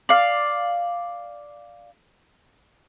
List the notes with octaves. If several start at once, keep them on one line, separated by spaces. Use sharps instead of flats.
D5 F5